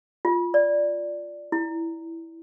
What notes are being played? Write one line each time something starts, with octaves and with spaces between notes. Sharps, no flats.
F4
D5
E4